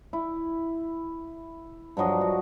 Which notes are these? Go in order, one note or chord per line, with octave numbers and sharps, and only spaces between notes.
E4
G2 F3 F#3 D#5
F#4